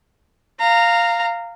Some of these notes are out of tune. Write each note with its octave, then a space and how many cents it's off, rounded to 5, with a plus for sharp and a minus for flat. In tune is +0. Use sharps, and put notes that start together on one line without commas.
F5 -5 A#5 -15